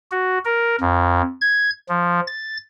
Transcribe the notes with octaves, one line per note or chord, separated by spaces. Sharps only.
F#4
A#4
F2
G#6
F3
A6